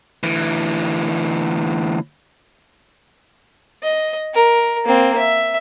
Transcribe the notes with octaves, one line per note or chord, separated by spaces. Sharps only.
D2 E3
D#5
A#4
A#3 C4
E5